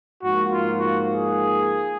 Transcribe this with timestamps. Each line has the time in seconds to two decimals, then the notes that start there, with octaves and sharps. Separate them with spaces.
0.23 G#2 F3 A#3 F#4
0.51 F4
0.79 F#4
1.08 G#4